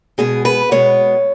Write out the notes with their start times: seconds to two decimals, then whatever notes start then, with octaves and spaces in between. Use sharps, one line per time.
0.18 B2 G#3 B3 G#4
0.45 B4
0.71 B2 G#3 B3 C#5